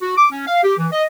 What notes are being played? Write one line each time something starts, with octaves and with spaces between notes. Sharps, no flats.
F#4
D6
C#4
F5
G4
E3
D#5